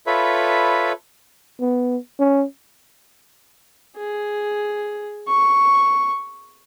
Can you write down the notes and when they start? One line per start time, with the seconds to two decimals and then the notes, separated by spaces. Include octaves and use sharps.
0.07 F4 A4 B4 C#5 E5 B5
1.60 B3
2.19 C#4
3.97 G#4
5.28 C#6